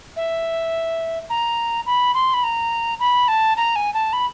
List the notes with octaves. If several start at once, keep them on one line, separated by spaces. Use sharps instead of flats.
E5
A#5
B5
C6
B5
A#5
B5
A5
A#5
G#5
A5
B5